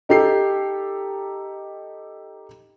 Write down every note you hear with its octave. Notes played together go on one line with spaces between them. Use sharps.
D#4 G4 A4 C7